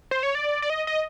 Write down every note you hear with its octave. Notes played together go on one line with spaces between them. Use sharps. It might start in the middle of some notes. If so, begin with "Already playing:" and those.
C5
C#5
D5
D5
D#5
D#5